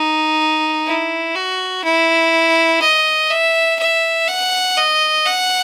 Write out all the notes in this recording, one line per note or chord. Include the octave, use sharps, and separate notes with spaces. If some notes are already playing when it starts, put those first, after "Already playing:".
Already playing: D#4
E4
F#4
E4
D#5
E5
E5
F#5
D#5
F#5